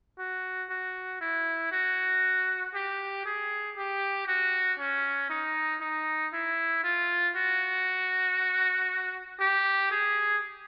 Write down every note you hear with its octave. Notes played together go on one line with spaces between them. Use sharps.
F#4
F#4
E4
F#4
G4
G#4
G4
F#4
C#4
D#4
D#4
E4
F4
F#4
G4
G#4